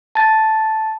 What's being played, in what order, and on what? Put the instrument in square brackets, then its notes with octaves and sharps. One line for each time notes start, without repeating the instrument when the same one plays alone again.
[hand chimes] A5 A6